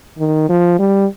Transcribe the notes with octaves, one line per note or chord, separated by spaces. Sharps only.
D#3
F3
G3